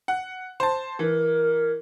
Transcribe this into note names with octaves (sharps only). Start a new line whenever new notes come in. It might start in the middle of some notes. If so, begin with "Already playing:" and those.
F#5
C5 A5
E3 A#4